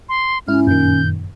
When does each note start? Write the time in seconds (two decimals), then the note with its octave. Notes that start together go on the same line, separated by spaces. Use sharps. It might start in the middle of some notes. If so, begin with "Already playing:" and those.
0.09 C6
0.48 G#2 C#4 E4 F6
0.67 F#2 A#2 D#3 G6